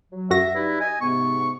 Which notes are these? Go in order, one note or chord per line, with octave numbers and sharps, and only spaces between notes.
F#3
F#2 F#4 E5 A#6
G3 D#4 E4 B4
D#5 G#5
G#2 C3 B3 C#6